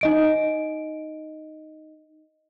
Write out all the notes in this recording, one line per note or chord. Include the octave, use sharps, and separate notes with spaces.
D#4 D#5 D7